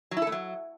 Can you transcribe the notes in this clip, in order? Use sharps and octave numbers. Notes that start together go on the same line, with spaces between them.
F#3
E4
A4
A3
F#3